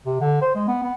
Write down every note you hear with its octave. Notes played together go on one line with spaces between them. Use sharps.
C3
D3
C5
G#3
B3
B3